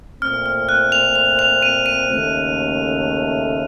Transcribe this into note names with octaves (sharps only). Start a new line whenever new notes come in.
A#2 A3 C4 F6
F6
F#6
F7
F7
F7
D#7
D#7
D#2 C#3 A3